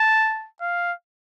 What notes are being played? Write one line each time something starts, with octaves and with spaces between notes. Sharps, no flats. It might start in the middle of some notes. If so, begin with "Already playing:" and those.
Already playing: A5
F5